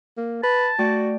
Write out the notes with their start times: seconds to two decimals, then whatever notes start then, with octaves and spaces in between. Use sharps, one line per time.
0.17 A#3
0.43 B4 A5
0.79 A3 F#4 D5 G5